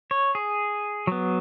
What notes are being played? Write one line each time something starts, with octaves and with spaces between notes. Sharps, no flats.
C#5
G#4
F#3 B3